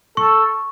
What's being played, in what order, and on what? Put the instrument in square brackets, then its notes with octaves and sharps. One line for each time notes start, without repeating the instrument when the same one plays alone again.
[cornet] A4 [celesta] C#6